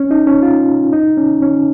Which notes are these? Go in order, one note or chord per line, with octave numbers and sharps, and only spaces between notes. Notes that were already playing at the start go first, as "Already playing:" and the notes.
Already playing: C#4
D#4
C#4
F4
D#4
C#4
C#4